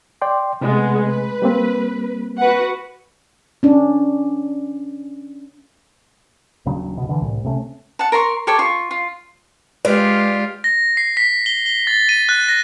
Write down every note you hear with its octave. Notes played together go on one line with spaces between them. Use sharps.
D5 G5 C6
C3 G#3 A3 B3
B4
G3 A#3 C4
F#4 B4 F#5
C#4 D4
D#1 C#3 F#3 D4
D1 B2
D3 E3
C2 A2
C3 A3 C4 C#4
F#5 A5
A#4 A#5 C6 C#6
G4 A4 C#5 D5
F4 C#6
F4
G#3 F4 G4 B4 D5
A#6
C7
B6
G7
G7
A6
D#7
F#6
A#6